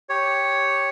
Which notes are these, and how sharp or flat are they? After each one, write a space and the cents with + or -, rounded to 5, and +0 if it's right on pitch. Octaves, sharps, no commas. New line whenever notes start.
G4 +0 C#5 +0